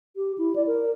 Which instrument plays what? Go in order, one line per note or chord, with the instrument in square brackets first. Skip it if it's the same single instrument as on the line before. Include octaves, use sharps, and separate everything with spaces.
[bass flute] G4
E4
D5
A#4